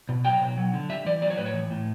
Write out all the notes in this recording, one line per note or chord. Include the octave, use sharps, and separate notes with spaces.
B2
F#3 G5
B2
F#3
D3
G3 E5
E3 D5
F#3 D5
C#5
A2 B4
C#5
E3
A2